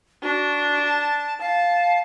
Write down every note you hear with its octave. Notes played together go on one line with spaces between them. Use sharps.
D4 F#4
A5
F5 A5